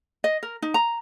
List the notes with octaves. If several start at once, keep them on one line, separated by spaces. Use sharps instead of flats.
D#5
A#4
D#4
A#5